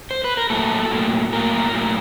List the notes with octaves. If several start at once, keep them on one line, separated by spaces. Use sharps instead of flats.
C5
B4
A#4
A2 F#3 A#3 A4
A2 F#3 A#3
A2 F#3 A#3 A#4
A2 F#3 A#3